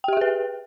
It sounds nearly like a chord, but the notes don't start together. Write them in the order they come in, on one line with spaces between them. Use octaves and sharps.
G5 G4 E5 G#4 B4